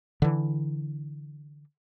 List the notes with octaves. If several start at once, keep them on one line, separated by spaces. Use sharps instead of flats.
D3 E3